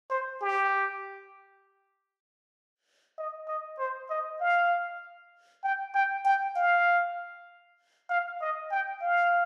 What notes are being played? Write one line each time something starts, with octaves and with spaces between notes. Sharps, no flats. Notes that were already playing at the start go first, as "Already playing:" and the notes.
C5
G4
D#5
D#5
C5
D#5
F5
G5
G5
G5
F5
F5
D#5
G5
F5